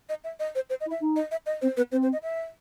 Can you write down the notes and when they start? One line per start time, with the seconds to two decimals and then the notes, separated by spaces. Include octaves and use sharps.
0.09 D#5
0.24 E5
0.40 D#5
0.55 C5
0.70 C5
0.81 D#5
0.86 E4
0.91 E5
1.01 D#4
1.16 D#5
1.31 E5
1.46 D#5
1.62 C4 C5
1.77 B3 B4
1.92 C4 C5
2.03 C5
2.13 D#5
2.23 E5